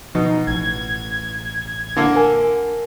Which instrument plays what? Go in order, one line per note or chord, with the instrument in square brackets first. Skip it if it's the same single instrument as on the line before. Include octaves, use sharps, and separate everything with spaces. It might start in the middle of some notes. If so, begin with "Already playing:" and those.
[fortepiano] B2 [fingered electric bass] F3 [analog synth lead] D#4
[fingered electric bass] A1 [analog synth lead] G#6
[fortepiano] D3 A#3
[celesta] A#4 G#5